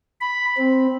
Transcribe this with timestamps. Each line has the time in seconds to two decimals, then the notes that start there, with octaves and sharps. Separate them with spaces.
0.21 B5
0.57 C4